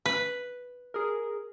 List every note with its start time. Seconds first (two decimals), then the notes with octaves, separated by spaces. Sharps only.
0.06 B4
0.94 G#4 A#4